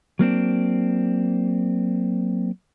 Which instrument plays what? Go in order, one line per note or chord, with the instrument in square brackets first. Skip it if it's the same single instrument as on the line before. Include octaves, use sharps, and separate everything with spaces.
[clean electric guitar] F#3 A#3 C4 D4